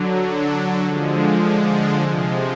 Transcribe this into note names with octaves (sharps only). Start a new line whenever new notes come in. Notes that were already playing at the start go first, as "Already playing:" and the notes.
Already playing: D3 F#3
D4
D3 F3 G#3
D4
D4
D4
C3 F3 G#3